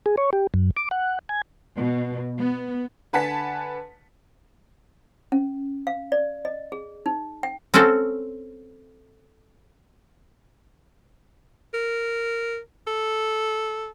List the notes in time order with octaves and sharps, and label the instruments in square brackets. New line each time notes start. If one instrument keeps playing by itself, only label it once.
[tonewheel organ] G#4
C#5
G4
F#2
D6
F#5
G#5
[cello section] B2
B3
[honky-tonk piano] D3 B4 F#5 G#5 A5 B6
[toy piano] C#4
F5
D5
D#5
G#4
D#4
G5
[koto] C4 C#4 F#4 A4 C5
[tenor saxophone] A#4
A4